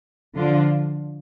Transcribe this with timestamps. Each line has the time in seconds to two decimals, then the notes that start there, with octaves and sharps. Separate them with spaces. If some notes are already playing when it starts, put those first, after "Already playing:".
0.35 D3 F3 D4 F4